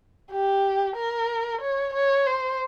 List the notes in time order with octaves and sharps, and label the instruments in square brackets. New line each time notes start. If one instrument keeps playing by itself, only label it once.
[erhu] G4
A#4
C#5
C#5
C5